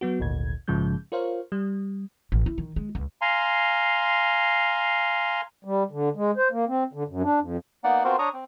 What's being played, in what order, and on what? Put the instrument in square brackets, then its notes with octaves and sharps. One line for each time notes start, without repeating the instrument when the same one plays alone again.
[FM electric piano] F#3 B3 F#4
G#1 D2 A#2 G#6
A#1 G#2 C#3 F3 G#3 G6
F4 A#4 C5 C#5 F5
G3
[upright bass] A1
E4
D#3
G#3
C#2
[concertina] F5 G#5 A#5 C6
[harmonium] G3
D3
G#3
C5
A#3
C4
D3
F#2
D4
F2
[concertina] A#3 B3 D#4 D5 F#5
B3 C4 F4 F#4 A#4 C5
D4 C#5 A#5 C#6 D#6
C4